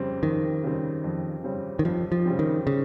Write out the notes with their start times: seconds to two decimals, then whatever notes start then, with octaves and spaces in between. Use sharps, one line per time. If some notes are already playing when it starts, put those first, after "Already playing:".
Already playing: F2 C#3 G3 C4
0.23 F2 D#3
0.64 C#3 G3 C4
1.04 F2
1.44 C#3 G3 C4
1.79 D#3
1.85 F2 F3
2.12 F3
2.25 C#3 G3 C4
2.39 D#3
2.67 C#3